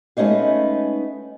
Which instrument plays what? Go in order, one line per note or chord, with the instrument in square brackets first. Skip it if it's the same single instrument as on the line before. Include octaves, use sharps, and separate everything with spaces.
[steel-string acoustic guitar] G#3 A3 B3 C#4 D#4 F5